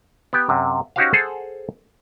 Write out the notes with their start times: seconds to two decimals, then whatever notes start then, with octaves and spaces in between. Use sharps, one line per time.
0.33 B3 G4
0.49 F#2 C3
0.96 C#4 D#4 F#4 G4 C5 F5
1.13 G#4 A4 C5 F#5